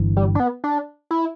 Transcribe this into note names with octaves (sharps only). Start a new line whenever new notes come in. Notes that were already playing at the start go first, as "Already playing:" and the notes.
Already playing: G1 G2 E3
G3
D4
B3
D4
E4